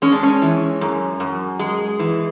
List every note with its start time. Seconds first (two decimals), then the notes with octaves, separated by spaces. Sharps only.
0.02 G#3 C#4
0.12 D4
0.23 C#4
0.42 E3
0.81 F#2
1.20 F#2
1.59 G#3
2.00 E3